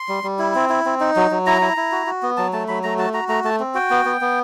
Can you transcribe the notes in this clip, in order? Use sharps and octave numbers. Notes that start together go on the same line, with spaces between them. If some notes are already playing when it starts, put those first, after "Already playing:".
Already playing: C6
G3
G3
E4
C4
E4
C4
D#4
F#3
F#3
E4 A#5
E4
E4
F#4
F#4
B3
F#3 A5
A3 A5
F#3 B5
A3 A#5
F#4 A5
F#4 A#5
A3 A#5
A3 A5
C4
F#4 G5
B3
B3
B3